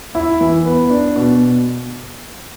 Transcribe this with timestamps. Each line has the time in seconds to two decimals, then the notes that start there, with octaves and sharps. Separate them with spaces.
0.15 E4
0.41 E3
0.65 B3
0.90 D4
1.16 B2